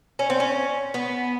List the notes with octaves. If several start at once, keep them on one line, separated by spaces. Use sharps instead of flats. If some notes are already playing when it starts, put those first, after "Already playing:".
C#4
C4
C#4
B3